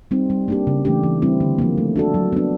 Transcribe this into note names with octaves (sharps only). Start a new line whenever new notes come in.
G3 C4 D#4
G3
A#3 D4 G4
C#3
E3 A3 D4 G4
E3
G3 C4 E4
D3
F3 A#3
A3
D4 F#4 A4
F#3
B3 D4